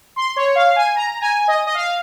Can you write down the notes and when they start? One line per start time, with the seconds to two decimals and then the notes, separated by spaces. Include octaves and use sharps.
0.16 C6
0.36 C#5
0.55 F5
0.76 G#5
0.96 A#5
1.21 G#5
1.48 D#5
1.67 D#5
1.75 F5